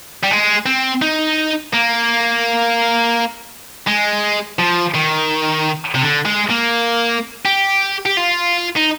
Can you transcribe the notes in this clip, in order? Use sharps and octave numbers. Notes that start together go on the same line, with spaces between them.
G3
G#3
C4
D#4
A#3
G#3
F3
D#3
C3
D3
G#3
A#3
G4
G4
F4
D#4